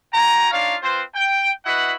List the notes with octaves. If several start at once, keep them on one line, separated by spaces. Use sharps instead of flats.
F#4 G5 G#5 A#5
D4 D#4 F4 C#5 F5
C4 F4 B4 C5
G5
E4 F#4 B4 D#5 F#5 B5